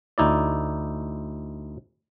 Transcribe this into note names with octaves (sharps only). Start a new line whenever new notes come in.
D2 D#4 E4 D5